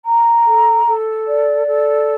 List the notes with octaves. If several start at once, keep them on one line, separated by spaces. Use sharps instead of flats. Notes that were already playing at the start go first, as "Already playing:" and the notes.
A#5
A4
A4
D5
A4